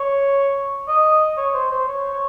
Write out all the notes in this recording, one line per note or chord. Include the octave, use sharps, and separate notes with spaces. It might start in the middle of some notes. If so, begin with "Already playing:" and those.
Already playing: C#5
D#5
C#5
C5
C5
C#5
C#5